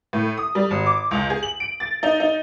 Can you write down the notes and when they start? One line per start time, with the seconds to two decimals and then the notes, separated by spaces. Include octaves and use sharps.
0.13 A2
0.37 D#6
0.55 G3
0.71 G#1
0.86 D6
1.11 C#2
1.30 G#4
1.43 F#7
1.60 D7
1.80 A6
2.03 D#4
2.20 D#4